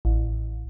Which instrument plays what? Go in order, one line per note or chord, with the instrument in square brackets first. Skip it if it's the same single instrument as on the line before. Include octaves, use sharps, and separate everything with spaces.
[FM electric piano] A1